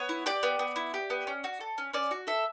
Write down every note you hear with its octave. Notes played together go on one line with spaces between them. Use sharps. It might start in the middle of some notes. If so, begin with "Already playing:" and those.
Already playing: B3 C#5
E4
G4 D5
B3
B3
E4
G4
B3
C#4
F#4
A4
C#4
C#4 D5
F#4
A4 E5